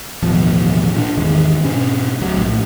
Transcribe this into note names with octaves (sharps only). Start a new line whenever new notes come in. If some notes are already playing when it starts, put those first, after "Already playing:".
A1 D#2 B2 F3
A#2 C4 D4
G#1 E2 D#3 G#3
G#2 B2 C#4
D2 F#3
A#1 A2